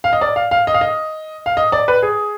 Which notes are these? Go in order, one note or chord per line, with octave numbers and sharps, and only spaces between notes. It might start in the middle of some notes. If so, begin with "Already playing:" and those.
F5
D#5
D5
F5
F5
D#5
F5
D#5
F5
D#5
D5
B4
G#4